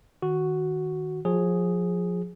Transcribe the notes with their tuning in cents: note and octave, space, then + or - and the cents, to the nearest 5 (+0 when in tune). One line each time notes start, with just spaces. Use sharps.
D#3 +0 F#4 +0
F3 +30 G#4 +0